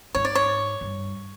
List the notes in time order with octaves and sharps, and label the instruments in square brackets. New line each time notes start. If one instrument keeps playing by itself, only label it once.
[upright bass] G#2 [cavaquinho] C#5
[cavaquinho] D5
C#5
[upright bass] G2